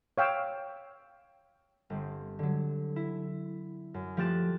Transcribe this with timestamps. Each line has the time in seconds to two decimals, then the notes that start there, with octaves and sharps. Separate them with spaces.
0.18 C#5 F5 G5 E6
1.90 G1 C4
2.39 D3 F#3
2.96 E4
3.94 F#2
4.17 F3 A3 G4 F#6 A6 E7